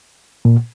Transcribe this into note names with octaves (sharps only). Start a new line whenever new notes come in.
A#2